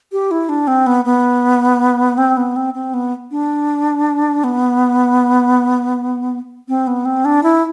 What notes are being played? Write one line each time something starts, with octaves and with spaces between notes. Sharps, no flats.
G4
E4
D4
C4
B3
B3
C4
B3
C4
C4
B3
D4
B3
C4
B3
C4
D4
E4